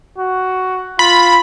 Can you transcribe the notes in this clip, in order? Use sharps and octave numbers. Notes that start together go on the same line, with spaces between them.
F#4
F4 B5